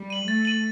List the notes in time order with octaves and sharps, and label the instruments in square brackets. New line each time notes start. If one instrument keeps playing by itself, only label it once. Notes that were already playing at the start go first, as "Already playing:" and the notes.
Already playing: [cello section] G3
[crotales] D#7 F#7
[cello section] A3 [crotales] A6
[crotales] D#7 F#7